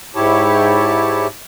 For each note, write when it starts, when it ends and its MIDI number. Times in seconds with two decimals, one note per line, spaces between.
0.15 1.27 44
0.15 1.27 64
0.15 1.27 67
0.15 1.27 73
0.15 1.27 81